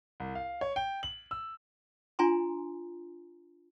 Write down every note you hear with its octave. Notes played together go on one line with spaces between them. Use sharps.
C2
F5
C#5
G5
F#7
E6
D4 F4 G#5 A#5 C6